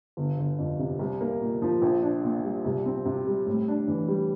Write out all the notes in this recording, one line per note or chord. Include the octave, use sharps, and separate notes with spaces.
G1
G1
F2
C3
C2
A#3
A#2
F3
A#1
D4
A#2
G3
C2
C4
C3
G3
A2
D4
E3
G3